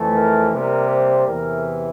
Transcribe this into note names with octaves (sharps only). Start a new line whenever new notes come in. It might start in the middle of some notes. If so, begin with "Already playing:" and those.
Already playing: F2 E3 A3
A#4
C3 G3 A#3 A#4
C5
E2 C3 E3 A#4